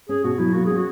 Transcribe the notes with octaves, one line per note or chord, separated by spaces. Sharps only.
C#4 G#4
B2 F#4
F#3 E4
A#3 F#4
C#4 G#4
F#4